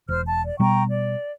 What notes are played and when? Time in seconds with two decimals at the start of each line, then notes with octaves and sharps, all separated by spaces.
0.09 E1 C5 F6
0.27 A5
0.44 D5
0.60 B2 G3 B3 G5 A#5 C#6
0.89 D5